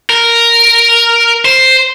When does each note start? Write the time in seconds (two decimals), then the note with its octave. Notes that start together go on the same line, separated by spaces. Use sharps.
0.10 A#4
1.45 C5